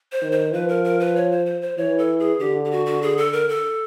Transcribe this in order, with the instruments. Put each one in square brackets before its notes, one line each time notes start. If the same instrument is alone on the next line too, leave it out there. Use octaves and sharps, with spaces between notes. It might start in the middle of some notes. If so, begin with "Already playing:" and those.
[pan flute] C5
[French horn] D#3
[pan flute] C5
[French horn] F3 [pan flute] B4
[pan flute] A#4
A#4
B4
C#5
C5
C5
C5
[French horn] E3 [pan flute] C#5
[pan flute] A4
G#4
[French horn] D3 [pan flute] G4
[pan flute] G4
F#4
F#4
G#4
A4
A#4
A4